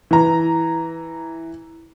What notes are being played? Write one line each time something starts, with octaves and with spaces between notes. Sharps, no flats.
E3 A#5